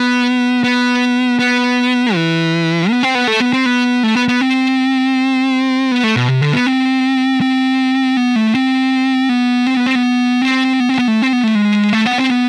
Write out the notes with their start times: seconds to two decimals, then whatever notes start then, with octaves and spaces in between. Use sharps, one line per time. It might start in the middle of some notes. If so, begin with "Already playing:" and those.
Already playing: B3
0.64 B3
1.39 B3
2.15 E3
2.90 B3
3.03 C4
3.15 B3
3.27 A3
3.40 B3
3.53 C4
3.66 B3
4.03 A3
4.15 B3
4.28 B3
4.41 C4
5.91 B3
6.04 A3
6.16 B2
6.28 C3
6.41 D3
6.53 B3
6.67 C4
7.41 C4
8.17 B3
8.36 A3
8.55 C4
9.29 B3
9.67 C4
9.77 B3
9.86 C4
9.95 B3
10.42 C4
10.80 B3
10.89 C4
10.99 B3
11.08 A3
11.22 C4
11.33 B3
11.44 A3
11.55 G#3
11.93 A3
12.06 B3
12.18 C4
12.30 B3